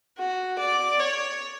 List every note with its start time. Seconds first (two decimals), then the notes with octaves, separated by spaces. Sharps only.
0.18 F#4
0.58 D5
0.99 C#5